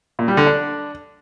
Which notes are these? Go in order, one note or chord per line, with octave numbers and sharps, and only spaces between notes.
A#2
G3
D3
D4